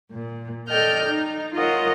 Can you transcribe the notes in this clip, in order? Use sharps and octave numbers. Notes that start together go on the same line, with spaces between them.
A#2
A4 D5 D#5 G5 F6 G6
D#4
F4 A#4 C#5 D#5 F5 F#5